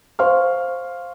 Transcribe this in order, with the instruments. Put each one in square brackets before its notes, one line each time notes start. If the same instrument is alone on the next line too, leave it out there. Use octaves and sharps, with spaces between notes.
[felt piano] C5 F5 C6 C#6 F6